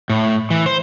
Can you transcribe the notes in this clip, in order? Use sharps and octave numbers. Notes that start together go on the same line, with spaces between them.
A2
E3
C5